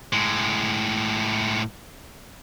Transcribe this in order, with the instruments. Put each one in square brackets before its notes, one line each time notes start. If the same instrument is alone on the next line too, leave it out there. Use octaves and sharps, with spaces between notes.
[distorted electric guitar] A2 G#3